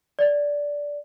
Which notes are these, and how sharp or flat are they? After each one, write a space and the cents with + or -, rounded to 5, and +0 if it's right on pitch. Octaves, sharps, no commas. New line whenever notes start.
D5 -10